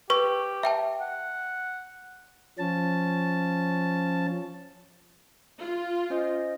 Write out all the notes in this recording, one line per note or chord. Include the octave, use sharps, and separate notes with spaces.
G4 B4 C#6
E5 G5 A5
F#5
F3 C#4 A5
F4
C#4 C5 D#5